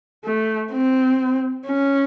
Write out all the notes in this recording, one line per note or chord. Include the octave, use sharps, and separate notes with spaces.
A3
C4
C#4